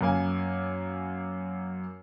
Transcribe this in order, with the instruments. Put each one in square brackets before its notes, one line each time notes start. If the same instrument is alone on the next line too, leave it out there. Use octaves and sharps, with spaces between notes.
[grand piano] F#2 A#3 G#5